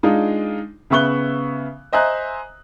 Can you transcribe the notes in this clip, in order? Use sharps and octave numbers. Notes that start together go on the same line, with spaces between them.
G#3 D4 D#4 F4
C#3 B3 E5 C#6 F#6 G7
C5 D#5 E5 G#5 A#5 F#6